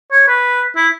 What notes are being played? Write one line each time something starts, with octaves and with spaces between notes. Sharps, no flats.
C#5
B4
E4